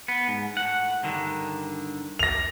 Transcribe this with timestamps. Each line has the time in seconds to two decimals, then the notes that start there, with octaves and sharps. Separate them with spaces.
0.08 B3
0.28 G#2
0.57 A2 F#5
1.03 G2 D3 D#3
2.19 A#6 F7